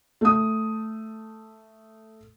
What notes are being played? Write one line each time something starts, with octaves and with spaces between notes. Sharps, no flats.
A3 D#6